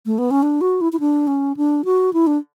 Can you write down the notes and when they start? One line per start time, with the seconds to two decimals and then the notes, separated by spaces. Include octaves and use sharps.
0.06 A3
0.18 B3
0.31 C#4
0.43 D4
0.61 F#4
0.81 E4
0.92 E4
1.00 D4
1.27 C#4
1.56 D4
1.85 F#4
2.13 E4
2.27 D4